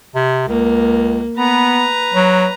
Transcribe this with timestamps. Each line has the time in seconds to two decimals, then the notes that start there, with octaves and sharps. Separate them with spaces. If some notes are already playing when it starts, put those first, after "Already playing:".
0.15 C3
0.48 C#2 A#3
1.37 B3 B4 A#5
2.14 F#3